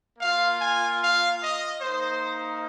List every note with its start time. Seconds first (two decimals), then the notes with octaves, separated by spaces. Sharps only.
0.19 A#3 F4 F5
0.59 G#5
1.00 F5
1.41 D#5
1.81 A#3 D#4 C5